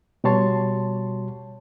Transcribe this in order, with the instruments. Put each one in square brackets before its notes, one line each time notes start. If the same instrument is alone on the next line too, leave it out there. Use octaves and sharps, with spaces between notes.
[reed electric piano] B2 G3 F#4 C#5 A5 C6